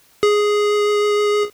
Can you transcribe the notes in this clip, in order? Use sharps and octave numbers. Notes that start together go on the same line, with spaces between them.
G#4